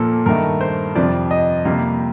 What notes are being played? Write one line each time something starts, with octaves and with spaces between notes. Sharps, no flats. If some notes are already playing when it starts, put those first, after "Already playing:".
Already playing: A#2 F3 A#3 A4
G2 D#3 A3 A#4
C5
F2 C3 F3 D5
D#5
F2 C3 G3 A#3